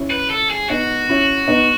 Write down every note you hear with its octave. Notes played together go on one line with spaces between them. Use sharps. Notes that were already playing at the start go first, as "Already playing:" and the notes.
Already playing: C#4 E4
B4
A4
G#4
B3 D#4 F#4
C#4 E4
B3 D#4